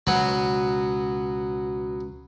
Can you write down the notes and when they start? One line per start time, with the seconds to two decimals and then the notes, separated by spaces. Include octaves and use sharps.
0.07 C#2 B2 F#3 B3